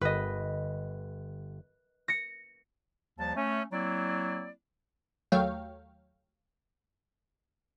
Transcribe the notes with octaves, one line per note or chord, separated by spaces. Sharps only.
G1 B4 D#5
A#6 C#7
D#2 F3 G3 A5
A3 C#4
F#3 A#3 C4 E4 D5
D#2 F#3 A3 C#5 F5 G5